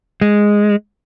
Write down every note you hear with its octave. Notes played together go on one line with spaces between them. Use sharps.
G#3